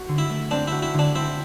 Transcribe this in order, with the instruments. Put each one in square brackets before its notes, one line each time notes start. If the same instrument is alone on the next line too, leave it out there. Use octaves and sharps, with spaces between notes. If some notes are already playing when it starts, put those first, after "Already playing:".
Already playing: [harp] F#4
D3
[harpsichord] E4
[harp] A3
[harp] C4 [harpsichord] D4
[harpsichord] E4 [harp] F#4
[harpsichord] E4
[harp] D3
[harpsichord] D4
[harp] C4 [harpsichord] E4